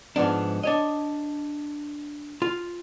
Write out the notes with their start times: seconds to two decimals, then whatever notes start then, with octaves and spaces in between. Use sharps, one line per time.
0.16 G#2 F3 B3 D4
0.63 D4 C#5 D#5
2.42 F4